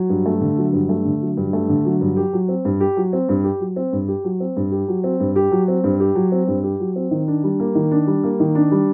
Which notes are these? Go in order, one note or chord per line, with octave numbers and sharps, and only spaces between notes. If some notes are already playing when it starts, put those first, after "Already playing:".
Already playing: F#3
G2
A3
D3
F#3
G2
A3
D3
F#3
G2
A3
D3
F#3
G2
G4
F#3
C4
G2
G4
F#3
C4
G2
G4
F#3
C4
G2
G4
F#3
C4
G2
G4
F#3
C4
G2
G4
F#3
C4
G2
G4
F#3
C4
G2
G4
F#3
C4
D#3
D4
G3
A#3
D#3
D4
G3
A#3
D#3
D4
G3